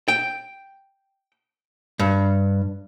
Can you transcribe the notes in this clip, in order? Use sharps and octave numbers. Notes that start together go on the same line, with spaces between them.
G5
G2